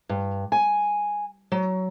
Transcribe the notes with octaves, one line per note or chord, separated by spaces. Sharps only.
G2
G#5
F#3